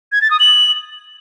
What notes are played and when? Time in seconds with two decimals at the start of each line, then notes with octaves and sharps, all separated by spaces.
0.12 G#6
0.21 A6
0.31 D#6
0.40 F#7